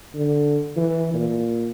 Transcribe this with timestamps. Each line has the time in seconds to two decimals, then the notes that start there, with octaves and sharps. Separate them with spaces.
0.15 D3
0.76 E3
1.14 A#2